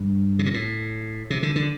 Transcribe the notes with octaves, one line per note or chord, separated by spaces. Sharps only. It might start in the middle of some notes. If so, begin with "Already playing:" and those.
Already playing: G2
C3
A#2
A2
C3
D3
D3